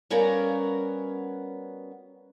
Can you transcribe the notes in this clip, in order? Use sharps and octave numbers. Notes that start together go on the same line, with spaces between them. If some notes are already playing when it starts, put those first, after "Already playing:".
G3 B3 C#4 F#4 A#4 F5